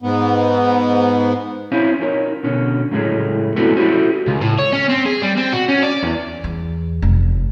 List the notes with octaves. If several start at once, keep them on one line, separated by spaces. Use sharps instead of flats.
G#2 B3
C4 C#4 E4 C5 C#5 F5
C#4 D#4 A#4 C#5
B2 D3 C#4
F#2 A2 C#3 G#3 A3 C#4
A3 B3 C4 E4 F#4 A4
C#4 E4 F#4 G4 A4 C5
C#2
A2
C#5
C#4
C4
G#4
G3
C4
F#4
C#4
D5
E2
E2
F1